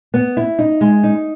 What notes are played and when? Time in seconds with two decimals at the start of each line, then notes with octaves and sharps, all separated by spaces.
0.14 B3
0.37 E4
0.59 D#4
0.81 G#3
1.03 D#4